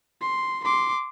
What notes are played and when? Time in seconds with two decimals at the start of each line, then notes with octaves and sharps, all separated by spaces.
0.21 C6
0.64 C6 D6